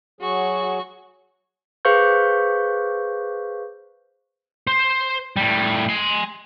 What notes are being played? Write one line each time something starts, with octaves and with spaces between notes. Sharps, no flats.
F#3 F#4 G#4 C#6
G#4 B4 C5 F5 C#6 G6
C5
A2 G3
G#5 C6